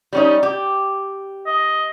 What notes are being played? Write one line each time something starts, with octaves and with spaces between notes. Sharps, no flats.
G3 C#4 D#4
G4
D#5